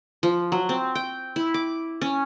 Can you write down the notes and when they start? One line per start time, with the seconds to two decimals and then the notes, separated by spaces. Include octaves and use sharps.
0.23 F3
0.52 F#3
0.69 C4
0.95 G5
1.36 E4
1.54 D6
2.01 C#4